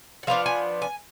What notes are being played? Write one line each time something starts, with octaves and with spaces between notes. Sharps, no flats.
F#5
F3 B3 D4 F5
G#5
G#5